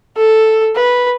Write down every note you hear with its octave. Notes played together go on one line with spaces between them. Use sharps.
A4
B4